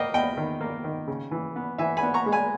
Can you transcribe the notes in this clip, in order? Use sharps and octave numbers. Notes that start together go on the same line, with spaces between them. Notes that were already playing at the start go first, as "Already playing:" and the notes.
Already playing: A#3 D#5 G5
E2 D#5 G5
D#3
A#3
D#3
C#3
E3
B3
E3 E5 G#5
G#5 B5
B3
A#5 C#6
G#3
G#5 B5